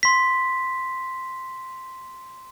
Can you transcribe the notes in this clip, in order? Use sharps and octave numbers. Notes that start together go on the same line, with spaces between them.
C6 B6